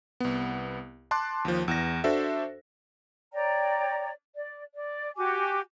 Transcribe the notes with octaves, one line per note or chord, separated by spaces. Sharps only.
C2 B3
A5 C6 D6 F#6
D#2 F3
E2 A#6
D4 F#4 A4 C5 E5
C#5 D5 G5 A#5
D5
D5
F#4 G4 G#5 D6